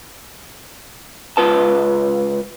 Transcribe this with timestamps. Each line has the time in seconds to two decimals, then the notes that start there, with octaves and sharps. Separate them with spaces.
1.37 C#2 F4 B4 A5